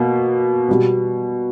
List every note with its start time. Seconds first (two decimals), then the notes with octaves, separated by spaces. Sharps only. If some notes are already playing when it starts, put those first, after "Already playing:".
Already playing: B2 A#3
0.68 B2 G3 B3